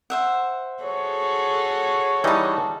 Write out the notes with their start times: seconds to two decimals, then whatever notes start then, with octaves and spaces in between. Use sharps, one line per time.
0.10 C5 E5 F#5
0.83 F#4 G#4 A4 C#5
2.24 E3 G3 D#4 D#5 A5